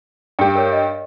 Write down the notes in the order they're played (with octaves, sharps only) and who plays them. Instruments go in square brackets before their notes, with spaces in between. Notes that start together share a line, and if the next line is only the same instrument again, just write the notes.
[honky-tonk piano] G2 G4 [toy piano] D5 G5 D6
[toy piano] A#4 C#5
D#5